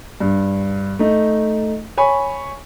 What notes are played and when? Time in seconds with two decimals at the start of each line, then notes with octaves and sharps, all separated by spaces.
0.20 G2
0.99 A3 D#4
1.98 C#5 G#5 B5 C#6